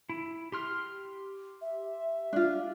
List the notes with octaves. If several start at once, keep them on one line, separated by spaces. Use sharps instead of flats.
E4
G4 C6 F6
E5
D4 F4